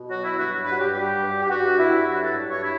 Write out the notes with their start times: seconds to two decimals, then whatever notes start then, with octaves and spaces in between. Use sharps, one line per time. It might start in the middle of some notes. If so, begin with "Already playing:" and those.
Already playing: B2
0.09 F#3 F#4
0.23 E4
0.37 G2 F#4
0.65 G2 B4
0.72 F#4
0.80 G4
0.93 G3 G4
1.22 G2
1.43 G4
1.49 G2 F#4
1.78 G2 E4
2.07 F#3 F#4
2.21 A4
2.36 G2
2.49 C#5
2.63 E4